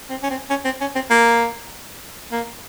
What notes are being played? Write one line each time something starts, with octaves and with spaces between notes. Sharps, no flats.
C4
C#4
C4
C#4
C4
C#4
C4
A#3
A#3